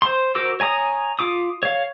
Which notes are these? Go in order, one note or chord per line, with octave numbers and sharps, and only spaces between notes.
C5 C6
F#4 A#4 C5 D6 E6
C#5 G#5 A#5 D#6
F4 D6 D#6
C#5 F5